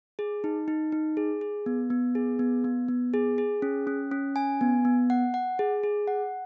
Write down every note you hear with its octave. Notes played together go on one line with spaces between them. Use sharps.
G#4
D#4
D#4
D#4
G#4
G#4
B3
B3
G#4
B3
B3
B3
G#4
G#4
C#4
C#4
C#4
G#5
B3
B3
F#5
F#5
G#4
G#4
F#5